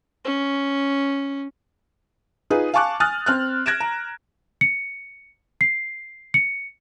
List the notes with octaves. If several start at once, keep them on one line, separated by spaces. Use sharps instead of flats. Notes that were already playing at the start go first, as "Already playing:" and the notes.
C#4
D#4 F4 G#4 B4
F5 G#5 A5 C#6 D6 F#6
G#5 D#6 F6 F#6 A6
C4 F6 F#6
F#6 G#6 A#6 D7 E7
A#5
C#7
C7
C#7